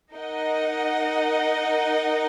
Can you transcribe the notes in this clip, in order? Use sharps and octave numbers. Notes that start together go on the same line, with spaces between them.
D#4 A#4 D#5 F#5